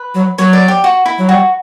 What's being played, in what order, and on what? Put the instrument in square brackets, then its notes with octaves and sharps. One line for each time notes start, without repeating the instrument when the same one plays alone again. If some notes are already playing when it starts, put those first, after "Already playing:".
Already playing: [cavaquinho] B4
[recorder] F#3
[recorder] F#3 [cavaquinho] C#5
[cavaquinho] D5
G4
F#4
E4
[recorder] F#3
[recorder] G3 [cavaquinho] F#4